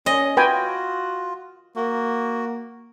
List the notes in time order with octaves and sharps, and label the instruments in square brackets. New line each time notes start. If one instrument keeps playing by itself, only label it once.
[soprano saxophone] C#4 [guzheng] D#5
[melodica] F4 [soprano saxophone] F#4 [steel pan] B4 G5 G#5
[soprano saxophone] A#3 [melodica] F#4